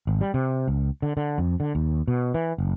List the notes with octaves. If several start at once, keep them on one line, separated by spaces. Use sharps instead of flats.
G#1
G3
C3
C#2
D3
D3
F2
D3
D#2
B2
E3
F#1